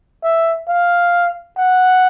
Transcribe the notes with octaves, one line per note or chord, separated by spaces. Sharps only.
E5
F5
F#5